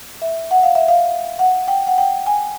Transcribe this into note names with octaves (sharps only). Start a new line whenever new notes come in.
E5
F#5
F5
E5
F5
F#5
G5
F#5
G5
G#5